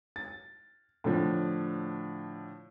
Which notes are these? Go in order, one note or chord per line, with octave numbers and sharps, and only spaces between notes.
A6
A2 D3 F3